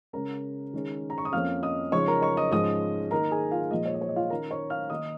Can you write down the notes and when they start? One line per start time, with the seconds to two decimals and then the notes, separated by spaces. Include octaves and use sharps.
0.13 C#3 G#3 C#4 A#4 A#5
0.73 D#3 G#3 C#4
1.10 A#5
1.18 C#6
1.25 D#6
1.32 F2 F3 A#3 C#4 F5 F6
1.63 D#5 D#6
1.92 C#3 F3 G#3 D#4 C#5 C#6
2.08 A#4 A#5
2.22 C#5 C#6
2.37 D#5 D#6
2.51 G#2 F3 G#3 C#4 D#5 D#6
3.11 D#3 A#3 D#4 A#4 A#5
3.31 G#4 G#5
3.51 F4 F5
3.70 A#2 F3 G#3 D#5
3.86 C#5
3.94 D#5
4.01 C#5
4.09 D#5
4.16 F4 F5
4.30 D#3 C#4 A#4 A#5
4.51 C#5 C#6
4.70 F5 F6
4.90 D#3 A#3 D#4 D#5 D#6